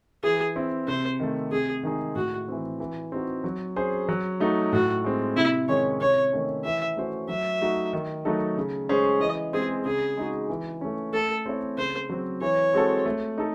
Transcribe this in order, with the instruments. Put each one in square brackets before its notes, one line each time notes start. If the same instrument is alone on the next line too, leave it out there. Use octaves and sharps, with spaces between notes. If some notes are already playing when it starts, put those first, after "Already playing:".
[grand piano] E3 [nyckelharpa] G#4
[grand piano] C4 E4
[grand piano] C3 [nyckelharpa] C5
[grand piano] D#3 A3
[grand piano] C3 [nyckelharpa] G#4
[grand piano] D#3 G#3 D#4 G#4
[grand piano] A2 [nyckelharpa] F#4
[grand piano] E3 C4
E3
C4 D#4 F#4
F#3
C#4 G#4 C5
F#3
A3 D#4 F#4
[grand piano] A2 [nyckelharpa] F#4
[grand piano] G#3 C4
[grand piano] C3 [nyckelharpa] E4
[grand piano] D#3 G#3 C#4 [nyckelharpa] C#5
[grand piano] C3 [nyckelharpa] C#5
[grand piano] D#3 A3 C#4
[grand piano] E3 [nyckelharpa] E5
[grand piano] A3 C#4 F#4 C5
[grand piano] F#3 [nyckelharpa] E5
[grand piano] A3 D#4 F#4
D#3
F#3 A3 D#4 A4
C#3
G#3 C#4 G#4 C5
[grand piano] E3 [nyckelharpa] D#5
[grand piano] G#3 C4 [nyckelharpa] G#4
[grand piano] C#3 [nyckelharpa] G#4
[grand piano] G#3 D#4 F#4
E3
A3 C#4
[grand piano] A3 [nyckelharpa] A4
[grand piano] C4 E4 A4 C#5
[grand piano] C#3 [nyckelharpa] C5
[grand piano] F#3 C4
[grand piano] E3 [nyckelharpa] C#5
[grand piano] G#3 C4 F#4 A4
A3
D#4 A4